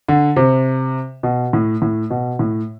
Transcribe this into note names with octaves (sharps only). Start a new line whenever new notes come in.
D3
C3
B2
A2
A2
B2
A2